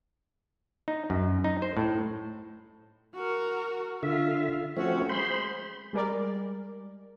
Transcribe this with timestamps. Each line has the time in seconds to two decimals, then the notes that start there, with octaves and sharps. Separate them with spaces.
0.88 D#4
1.10 F#2
1.44 D#4
1.62 C5
1.77 A2
3.14 F#4 A#4
4.03 D3 F4 E5
4.77 F3 A3 C4 C#4 F#4
5.09 G#3 C5 B5 C6
5.93 G3 G#3 A#4 D5